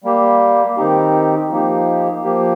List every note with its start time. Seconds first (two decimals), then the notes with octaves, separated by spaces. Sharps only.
0.04 G3 A#3 G4
0.77 D#3 C4 D#4 G4
1.50 F3 A#3 D#4 G4
2.24 F3 A#3 G4